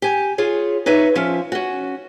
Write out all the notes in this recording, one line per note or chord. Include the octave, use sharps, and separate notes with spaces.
G4 G#5
F4 G#4 C#5
D#4 B4 C#5 E5
F3 C#4 F4 E5
C#4 F#4